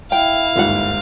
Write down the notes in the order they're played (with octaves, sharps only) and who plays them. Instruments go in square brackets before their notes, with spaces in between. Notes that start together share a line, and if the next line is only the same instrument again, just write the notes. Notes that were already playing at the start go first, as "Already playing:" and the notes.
[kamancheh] E4 [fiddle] F5 [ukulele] G5
[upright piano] G1 D#2 G#2 [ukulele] F4 F#5